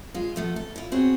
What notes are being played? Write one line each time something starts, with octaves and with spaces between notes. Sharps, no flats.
G#3 F4
F3 A3 B3
A4
E4 F4
B3 C4 F#4 G#4 C5 C#5